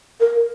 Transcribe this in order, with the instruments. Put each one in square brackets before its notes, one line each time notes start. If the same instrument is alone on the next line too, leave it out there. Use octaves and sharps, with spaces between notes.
[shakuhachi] A#4